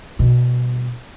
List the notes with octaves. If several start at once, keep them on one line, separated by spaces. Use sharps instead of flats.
B2 G3